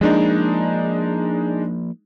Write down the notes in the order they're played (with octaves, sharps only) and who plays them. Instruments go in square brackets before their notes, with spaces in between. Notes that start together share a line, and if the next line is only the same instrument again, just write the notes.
[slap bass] F3 A#3 [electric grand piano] G#3 D4 D#4